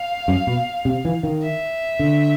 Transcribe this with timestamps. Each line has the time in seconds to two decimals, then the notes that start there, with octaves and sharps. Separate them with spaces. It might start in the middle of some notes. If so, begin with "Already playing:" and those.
Already playing: F5
0.28 F#2
0.47 B2
0.85 C3
1.05 E3
1.23 D#3
1.42 E5
1.99 D3